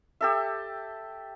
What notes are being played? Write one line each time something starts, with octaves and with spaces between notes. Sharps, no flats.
G4 A4 E5